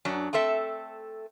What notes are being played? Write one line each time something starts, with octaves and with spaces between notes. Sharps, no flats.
F#2 F#3 D4
A3 C4 A4 E5